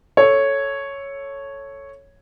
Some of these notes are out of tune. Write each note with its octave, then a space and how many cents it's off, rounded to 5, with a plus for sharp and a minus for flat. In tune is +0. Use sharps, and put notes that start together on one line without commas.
A4 +0 C#5 +0